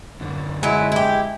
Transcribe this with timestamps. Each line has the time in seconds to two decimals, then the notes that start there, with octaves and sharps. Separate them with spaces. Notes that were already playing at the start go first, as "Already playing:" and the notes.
0.21 F#2 D3
0.63 F#3 G#3 E4
0.92 E4 G4